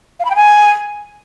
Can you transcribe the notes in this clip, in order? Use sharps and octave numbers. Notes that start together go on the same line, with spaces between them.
F5
B5
G5
G#5